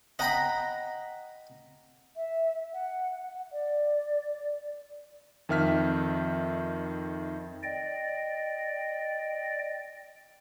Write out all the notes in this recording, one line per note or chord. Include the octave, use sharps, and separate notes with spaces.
D#5 F#5 G5 A#5 B5
E5
F#5
D5
F2 D#3 E5 F6 B6
D5 D#5 G5